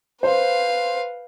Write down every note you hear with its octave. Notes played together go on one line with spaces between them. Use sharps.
B4 C5 F5